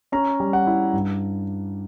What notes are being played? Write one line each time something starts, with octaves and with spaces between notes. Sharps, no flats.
C#4 A#5
G3
F#5
E4
G2